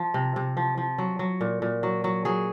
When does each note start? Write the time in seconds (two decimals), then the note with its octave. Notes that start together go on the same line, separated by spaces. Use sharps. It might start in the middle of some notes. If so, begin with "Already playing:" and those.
Already playing: F3
0.14 C3
0.36 C3
0.57 F3
0.78 F3
0.98 F#3
1.19 F#3
1.41 A#2
1.62 A#2
1.83 F#3
2.04 F#3
2.25 F#3 G#4